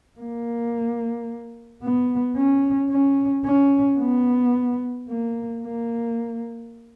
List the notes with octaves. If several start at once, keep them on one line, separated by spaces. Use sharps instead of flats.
A#3
B3
C#4
C#4
C#4
B3
A#3
A#3